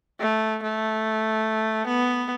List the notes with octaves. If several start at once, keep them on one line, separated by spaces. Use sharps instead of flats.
A3
A3
B3